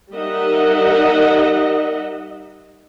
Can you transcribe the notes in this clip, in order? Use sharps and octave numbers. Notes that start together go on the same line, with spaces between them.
G3 D#4 A#4 D#5 E5 F#5